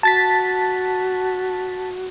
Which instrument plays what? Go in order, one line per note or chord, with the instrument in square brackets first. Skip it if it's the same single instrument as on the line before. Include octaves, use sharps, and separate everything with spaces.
[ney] F#4 [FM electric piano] A5 A6 B6